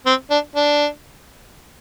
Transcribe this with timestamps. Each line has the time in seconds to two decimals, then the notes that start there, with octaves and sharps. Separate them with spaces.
0.06 C4
0.31 D4
0.56 D4